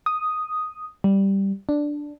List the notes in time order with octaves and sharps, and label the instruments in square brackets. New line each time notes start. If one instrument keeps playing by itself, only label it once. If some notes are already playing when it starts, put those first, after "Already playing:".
[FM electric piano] D#6
G3
D4